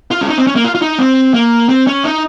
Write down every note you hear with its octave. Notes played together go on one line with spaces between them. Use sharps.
F4
C#4
D#4
C4
C#4
A#3
F4
F4
D#4
C4
A#3
C4
C#4
D#4